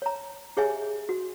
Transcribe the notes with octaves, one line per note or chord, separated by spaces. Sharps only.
C#5 A#5
G4 G#4 C#5 D#5 E5 G#5
F#4